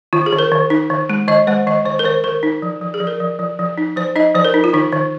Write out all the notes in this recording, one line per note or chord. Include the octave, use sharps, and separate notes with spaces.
D#3 F4
G#4
D#3
A#4
D#3
D#4
D#3
G#3
D#3 D#5
G#3 C5
D#3 D#5
D#3 C5
A#4
D#3 C5
D#3 A#4
D#4
F3
F3
G#4
F3
A#4
F3
F3
F3
D#4
F3 C5
D#4 D#5
F3 C5
A#4
D#4
F4
D#3 D#4
D#3